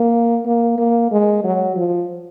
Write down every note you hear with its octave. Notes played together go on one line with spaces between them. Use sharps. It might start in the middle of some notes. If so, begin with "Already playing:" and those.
Already playing: A#3
A#3
A#3
G#3
F#3
F3